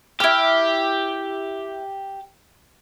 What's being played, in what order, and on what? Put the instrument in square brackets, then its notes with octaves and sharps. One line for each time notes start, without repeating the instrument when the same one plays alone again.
[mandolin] E4 F6 [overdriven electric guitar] G4